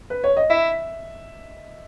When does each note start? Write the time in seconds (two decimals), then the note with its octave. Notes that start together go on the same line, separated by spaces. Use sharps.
0.10 B4
0.24 C#5
0.37 D#5
0.50 E4 E5